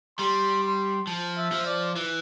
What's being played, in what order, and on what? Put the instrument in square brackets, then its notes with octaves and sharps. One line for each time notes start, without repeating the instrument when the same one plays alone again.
[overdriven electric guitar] G3 [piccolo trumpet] C6
[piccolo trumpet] C6
[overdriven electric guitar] F3
[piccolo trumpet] E5
[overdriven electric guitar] F3
[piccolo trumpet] D5
[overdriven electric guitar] E3